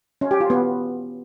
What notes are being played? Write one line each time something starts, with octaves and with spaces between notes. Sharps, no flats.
C#4
G4
F4
B3